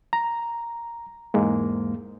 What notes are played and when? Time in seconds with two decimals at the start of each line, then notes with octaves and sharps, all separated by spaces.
0.13 A#5
1.34 E2 G#2 G#3 A#3